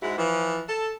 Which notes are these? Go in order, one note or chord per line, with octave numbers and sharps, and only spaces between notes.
G#2 G#3 E4 F#4 F#5
E3 F3
A4